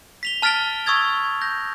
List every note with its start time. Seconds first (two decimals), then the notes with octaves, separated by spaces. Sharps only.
0.23 B6 F7 G7
0.42 A5 F6 A6 B6 D7 G7
0.86 C#6 D#6 E6 G#6 A6 F7
1.42 G6 A#6